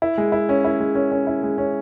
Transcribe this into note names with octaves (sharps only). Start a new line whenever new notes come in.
E4
G#3
E4
C#4
E4
G#3
C#4
C#4
E4
G#3
C#4